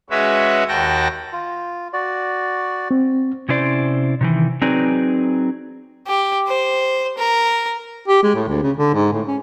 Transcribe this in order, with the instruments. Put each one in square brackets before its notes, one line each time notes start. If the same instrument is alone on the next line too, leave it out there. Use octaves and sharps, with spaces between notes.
[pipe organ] G#3 C#4 F#4 B4 C#5 E5
D#2 F#4 G5 A5 A#6
[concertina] F4
F#4 D5
[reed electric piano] C4
[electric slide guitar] C3 C#4 E4 C5 D5
C3 D#3 E3
F#3 C4 D#4 G#4 B4 D5
[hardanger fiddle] G4
C5
A#4
[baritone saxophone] G4
G#3
A2
D2
C#3
D3
G#2
A2
C#4